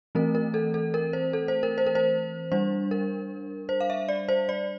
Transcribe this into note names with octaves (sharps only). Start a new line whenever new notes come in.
E3 A3 C4 A#4
A#4
A4
A4
A#4
C5
A4
C5
A#4
C5
A#4
C5
G3 D4 C5
A#4
C5
F5
E5
D5
C5
D5